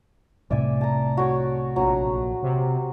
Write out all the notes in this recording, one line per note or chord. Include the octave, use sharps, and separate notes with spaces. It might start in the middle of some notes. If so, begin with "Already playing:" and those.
C2 A2 C3 D5 E5 G#5
A5 A#5
F#4 C#5 D6
A#1 F#3 A#5
C3